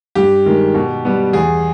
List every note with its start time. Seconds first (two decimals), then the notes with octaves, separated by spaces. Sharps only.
0.15 G2 G4
0.46 D#3 G#3
0.74 B2
1.05 G3 B3
1.33 E2 G#4